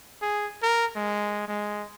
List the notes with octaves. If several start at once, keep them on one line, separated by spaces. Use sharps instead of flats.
G#4
A#4
G#3
G#3